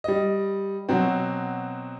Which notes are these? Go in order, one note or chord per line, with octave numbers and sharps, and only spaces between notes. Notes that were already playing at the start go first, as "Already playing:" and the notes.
G3 D#5
B2 F#3 C4